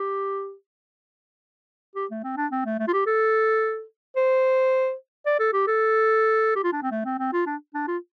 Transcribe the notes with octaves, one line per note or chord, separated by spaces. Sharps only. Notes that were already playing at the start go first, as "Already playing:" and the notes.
Already playing: G4
G4
A3
C4
D4
C4
A3
A3
F4
G4
A4
C5
D5
A4
G4
A4
G4
F4
D4
C4
A3
C4
C4
F4
D4
D4
F4